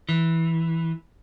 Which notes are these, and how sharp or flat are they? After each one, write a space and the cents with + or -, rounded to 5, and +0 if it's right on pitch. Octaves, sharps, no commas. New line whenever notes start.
E3 -5